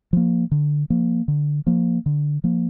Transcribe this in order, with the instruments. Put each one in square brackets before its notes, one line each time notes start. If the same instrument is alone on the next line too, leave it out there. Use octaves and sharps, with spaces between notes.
[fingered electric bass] F3 A#3
D3
F3 A#3
D3
F3 A#3
D3
F3 A#3